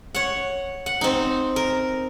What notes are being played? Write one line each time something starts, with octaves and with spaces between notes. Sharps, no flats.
C#5 F#5
F#5
C4 D#4
A#4